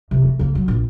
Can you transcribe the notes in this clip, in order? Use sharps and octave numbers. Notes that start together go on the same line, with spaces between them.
C3 E3
A3 A#3
C#3 A#3
F#3
A#1